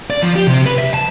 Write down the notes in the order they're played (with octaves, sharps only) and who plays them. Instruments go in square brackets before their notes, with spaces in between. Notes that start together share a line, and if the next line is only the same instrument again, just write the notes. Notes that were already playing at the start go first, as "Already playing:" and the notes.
[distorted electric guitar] D5
F3
G4
C3
B4
E5
A5